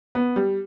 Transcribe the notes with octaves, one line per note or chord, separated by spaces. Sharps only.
B3
G3